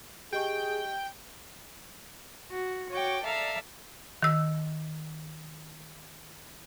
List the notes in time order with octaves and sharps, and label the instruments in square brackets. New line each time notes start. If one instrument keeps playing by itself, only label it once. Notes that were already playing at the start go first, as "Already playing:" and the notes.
[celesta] G4 D#5 C#6 [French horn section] G#4 [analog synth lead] G5
[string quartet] F#4
F#4 C#5 G5 D6
A4 D5 E5 F5 A#5
[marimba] D#3 E6